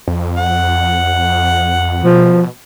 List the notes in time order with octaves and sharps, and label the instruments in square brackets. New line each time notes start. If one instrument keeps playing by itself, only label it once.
[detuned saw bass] F2
[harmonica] F#5
[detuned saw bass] B2 [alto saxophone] F3